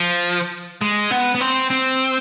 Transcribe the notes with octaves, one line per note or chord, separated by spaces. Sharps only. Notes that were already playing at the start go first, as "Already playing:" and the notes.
Already playing: F3
G#3
B3
B3
C4
C4